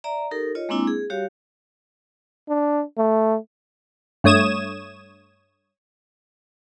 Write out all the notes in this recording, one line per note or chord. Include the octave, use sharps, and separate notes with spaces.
D5 E5 A#5
D#4 G4 A4 A#4
F4 C#5 D#5
G#3 A#3 C4 D4 E4
G#4
G3 F#4 G4 C#5 F5
D4
A3
G2 A3 C#5 D#6 G#6 E7